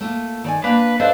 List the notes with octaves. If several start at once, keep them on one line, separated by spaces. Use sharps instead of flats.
A3 A#3 F4
D#3 D5 G#5
A#3 D4 B4
D4 A4 B4 C5 D#5 F5